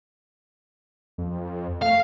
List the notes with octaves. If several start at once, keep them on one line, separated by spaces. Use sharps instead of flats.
F2
A3 F5